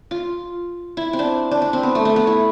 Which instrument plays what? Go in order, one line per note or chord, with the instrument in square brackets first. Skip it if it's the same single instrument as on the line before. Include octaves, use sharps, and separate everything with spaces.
[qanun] F4
E4
C4
D4
D4
D4
C4
B3
A3
A3
B3
E4